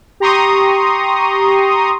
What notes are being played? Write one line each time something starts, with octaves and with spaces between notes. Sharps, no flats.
G4 A#5 C6 C#6 D#6